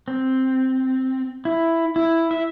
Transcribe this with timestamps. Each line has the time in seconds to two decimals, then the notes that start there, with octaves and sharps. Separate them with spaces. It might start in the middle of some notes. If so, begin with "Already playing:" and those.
0.08 C4
1.45 E4
1.96 E4
2.31 E5